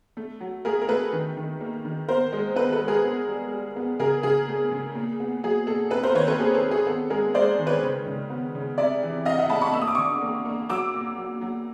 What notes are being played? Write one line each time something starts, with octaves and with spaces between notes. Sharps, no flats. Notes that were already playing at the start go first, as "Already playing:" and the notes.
A3
F#3
A3 G#4 A#4
A#4
A3 A4 B4
D#3
D#3
A#3
D#3
B3 A#4 C5
G#3
B3 A4 B4
A4 B4
G#3
G#4 A#4
B3
G3
G3
B3
C#3 G#4 A#4
C#3 G#4
A3
C#3
A#2
B3
F#3 G#4
A#2 A4
C3 A4 B4
A#4 C5
D#3 B4 C#5
A4 B4
A#3 G#4
A4
C3
G#4
B3 A4
G#3 G#4 A#4
G#3 C5 D5
D#3
B4 C#5
C#3
C#3
B3
C#3
C3 D5 E5
E3
C3 D#5 F5
E5 F#5
A3 A5 B5
B5 C#6
A#3 E6
D#6
D6
D3 C#6 D#6
A#3
A#3
F#3 D6 E6
A#2
F#3
F#3